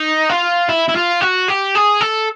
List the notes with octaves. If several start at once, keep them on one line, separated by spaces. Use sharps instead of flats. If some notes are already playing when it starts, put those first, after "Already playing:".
Already playing: D#4
F4
E4
E4
F4
F#4
G4
G#4
A4